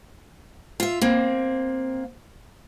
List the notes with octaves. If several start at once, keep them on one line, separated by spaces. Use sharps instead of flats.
F4 E5
A#3 C4